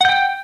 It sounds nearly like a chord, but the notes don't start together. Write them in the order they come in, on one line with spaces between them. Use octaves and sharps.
F#5 G6 G5